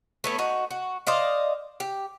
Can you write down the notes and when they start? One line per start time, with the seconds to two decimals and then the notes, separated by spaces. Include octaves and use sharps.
0.24 A3 B3 C#4
0.38 D#4 F#4
0.71 F#4
1.07 C5 D5 D#5 F5
1.80 G4